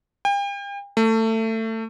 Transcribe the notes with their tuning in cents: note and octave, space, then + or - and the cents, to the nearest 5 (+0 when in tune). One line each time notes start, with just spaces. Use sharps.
G5 +40
A3 +25